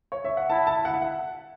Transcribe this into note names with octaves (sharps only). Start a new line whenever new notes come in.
C#5
E5
F#5
E4 A5
A5
F#5
E5
F#5